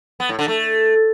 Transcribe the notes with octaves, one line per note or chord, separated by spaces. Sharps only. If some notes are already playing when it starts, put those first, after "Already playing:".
B3
A2
D3
A3